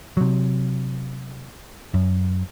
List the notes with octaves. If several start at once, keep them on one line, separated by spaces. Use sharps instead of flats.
C3 F#3
F#2